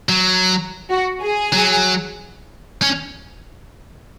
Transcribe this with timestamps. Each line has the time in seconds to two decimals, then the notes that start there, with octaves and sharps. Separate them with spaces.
0.09 F#3
0.90 F#4
1.21 G#4
1.53 F#3
2.82 C#4